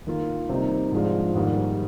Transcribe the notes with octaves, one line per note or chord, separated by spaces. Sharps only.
D#3 A#3 F4
C3 G3 A#3 D#4
G#2 F3 G#3 D4 F4
G#2 D#3 G3 A#3